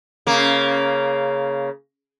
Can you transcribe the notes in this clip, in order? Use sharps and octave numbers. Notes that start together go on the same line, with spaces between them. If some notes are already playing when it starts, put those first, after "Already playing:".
C#3 A#3